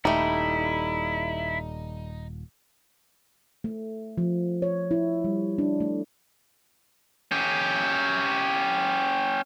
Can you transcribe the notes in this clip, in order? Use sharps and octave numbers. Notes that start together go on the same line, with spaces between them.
D#1 G3 A3 D#4 E4
A3
F3
C#5
E4
G3
D4
A3
C#4 G4